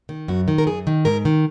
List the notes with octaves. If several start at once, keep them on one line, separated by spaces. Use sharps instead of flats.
D#3
F#2 F#4
D#3
A#4
F#2 G#4
D#3
G#2 A#4
D#3